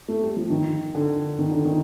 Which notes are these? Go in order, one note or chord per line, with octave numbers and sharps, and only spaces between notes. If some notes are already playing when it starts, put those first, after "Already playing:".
A3
G3
F3
D#3
D3
D#3
D3
D#3